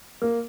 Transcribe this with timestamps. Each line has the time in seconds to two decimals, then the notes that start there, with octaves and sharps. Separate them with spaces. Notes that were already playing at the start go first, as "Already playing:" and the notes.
0.22 A#3